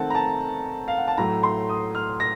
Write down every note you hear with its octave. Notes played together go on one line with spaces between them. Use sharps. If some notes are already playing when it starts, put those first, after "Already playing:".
Already playing: D#3 A3 C4 F#5 A5
A#5
A5
F5
F#5
A5
A2 F#3 A3 A#5
C6
D#6
F6
A#6